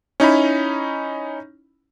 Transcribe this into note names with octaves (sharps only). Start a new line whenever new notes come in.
C#4 D#4 E4 B5